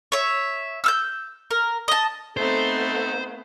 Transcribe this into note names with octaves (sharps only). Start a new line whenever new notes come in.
C#5 E5
E6 F6 G6
A#4
D#5 A5
A3 B3 C4 D#4 A4 C5